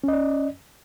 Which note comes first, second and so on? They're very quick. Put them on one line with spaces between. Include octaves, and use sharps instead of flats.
C#4 D#5 D5